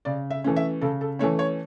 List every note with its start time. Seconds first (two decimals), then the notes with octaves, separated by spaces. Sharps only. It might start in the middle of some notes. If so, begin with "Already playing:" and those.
0.05 C#3 D5
0.30 E5
0.44 E3 A3 C#4
0.56 E5
0.81 C#3 A4
1.01 A4
1.19 E3 A3 C#4 C#5
1.39 C#5